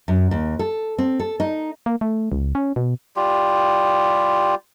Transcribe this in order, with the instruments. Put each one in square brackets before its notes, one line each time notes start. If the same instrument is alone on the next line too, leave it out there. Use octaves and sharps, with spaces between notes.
[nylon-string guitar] F#2
D#2
A4
C4
A4
D#4
[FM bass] A#3
A3
C#2
C#4
B2
[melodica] G3 F4 G4